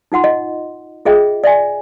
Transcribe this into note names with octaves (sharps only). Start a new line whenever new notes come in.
D#4 F4 F#5 C6
D#5
F4 G#4 D#5 E5 G5
D5 E5 G#5